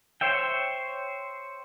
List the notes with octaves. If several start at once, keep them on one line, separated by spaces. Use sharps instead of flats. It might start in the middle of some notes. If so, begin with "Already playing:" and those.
C5 C#5 E5 G5